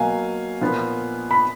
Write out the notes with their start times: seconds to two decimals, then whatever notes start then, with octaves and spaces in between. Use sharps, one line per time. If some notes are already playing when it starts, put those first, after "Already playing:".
Already playing: B2 F#3 A#3 F5 G#5
0.61 A#2 F3 B3
1.31 B5